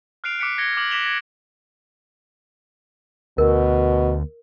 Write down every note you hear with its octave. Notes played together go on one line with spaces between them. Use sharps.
F6 F#6 C7 D7 F7
D6 F#6 B6 C#7 D7
G#6 A#6 C#7 G7
D6 F6 F#7
D6 A#6 B6 E7 F7 G7
G#6 A#6
D2 B2 A#4